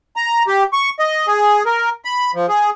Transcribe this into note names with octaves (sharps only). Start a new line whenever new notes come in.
A#5
G4
C#6
D#5
G#4
A#4
B5
F3
G#4